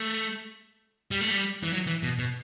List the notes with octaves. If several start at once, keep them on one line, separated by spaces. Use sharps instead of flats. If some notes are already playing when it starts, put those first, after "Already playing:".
Already playing: A3
G3
A3
G3
E3
F#3
E3
B2
B2